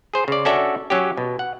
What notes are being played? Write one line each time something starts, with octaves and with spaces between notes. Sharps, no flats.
G#4 C5
C#3 D5
C#4 D4 F#4 A4 D5 E5
F#3 C#4 G4
B2
F#5